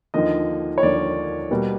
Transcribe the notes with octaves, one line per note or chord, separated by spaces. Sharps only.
D#2 D3 F3 A#3 D#5
C#5
D#2 D3 F3 A#3 D5
B2 G3 A#3